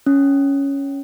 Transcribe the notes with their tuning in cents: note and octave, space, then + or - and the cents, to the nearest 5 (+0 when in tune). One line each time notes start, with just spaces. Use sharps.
C#4 +5